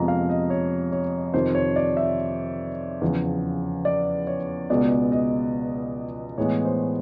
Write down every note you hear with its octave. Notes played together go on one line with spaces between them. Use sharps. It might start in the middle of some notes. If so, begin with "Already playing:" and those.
Already playing: F2 C3 F3 G#3 B3 A#5
F5
D#5
C#5
C#5
F2 C3 D#3 C5
C#5
D5
E5
E2 C#3 F3
D5
C#5
C#2 B2 G#3 B3 D5
D#5
A2 E3 G#3 B3 C#5
C5